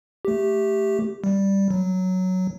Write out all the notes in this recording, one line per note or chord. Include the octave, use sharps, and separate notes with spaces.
A3 G4
G3
F#3